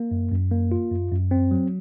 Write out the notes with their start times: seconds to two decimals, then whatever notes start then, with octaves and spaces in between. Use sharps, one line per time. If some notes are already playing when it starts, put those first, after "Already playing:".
Already playing: A#3
0.11 F#2
0.31 F#2
0.51 A#3
0.72 F4
0.91 F#2
1.11 F#2
1.31 C4
1.51 F#3